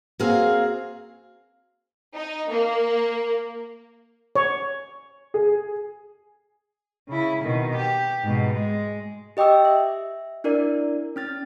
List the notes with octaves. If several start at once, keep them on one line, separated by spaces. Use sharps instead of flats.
A#3 C4 F#4 G#4 F5
D#4
A#3
C#5
G#4
C#3 E4
B2 D#3
G4
G#2 B2
G#3
G4 D#5 G5 D6 E6
E5
D4 E4 A#4 D5
C#4 F6 A6